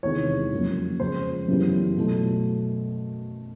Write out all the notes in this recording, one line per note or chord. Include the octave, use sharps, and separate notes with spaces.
E2 C3 D#3 G#3 C#5
F2 C#3 F#3 A#3
C#3 F3 G#3 C5
F#2 C#3 E3 G3 B3
B2 F#3 A3